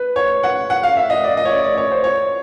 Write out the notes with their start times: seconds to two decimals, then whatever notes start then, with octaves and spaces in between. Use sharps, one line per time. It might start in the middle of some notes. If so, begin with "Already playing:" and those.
Already playing: B4
0.16 C#5
0.43 F#5
0.70 F#5
0.83 F5
0.97 E5
1.10 D#5
1.24 D5
1.37 D#5
1.45 C#5
1.51 D5
1.64 D5
1.77 C#5
1.91 C5
2.04 C#5